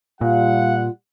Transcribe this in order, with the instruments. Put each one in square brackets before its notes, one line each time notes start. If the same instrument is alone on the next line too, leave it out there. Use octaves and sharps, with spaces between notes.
[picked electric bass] A#2 [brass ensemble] G3 F#5 [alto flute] F4 [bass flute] F5